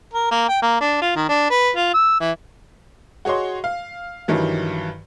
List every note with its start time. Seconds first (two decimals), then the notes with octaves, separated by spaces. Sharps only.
0.14 A#4
0.31 A#3
0.48 G5
0.62 A#3
0.81 D4
1.02 F4
1.15 D#3
1.29 D4
1.50 B4
1.76 F4
1.94 E6
2.20 E3
3.25 F#4 G#4 C#5 D#5 C6
3.64 F5
4.28 G2 D#3 E3 F#3